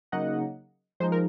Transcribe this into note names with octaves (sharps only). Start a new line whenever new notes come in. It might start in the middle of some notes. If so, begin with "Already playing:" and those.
C#3 F#3 A#3 D#4 D#5 F#5
F3 G#3 D#4 C5
A#4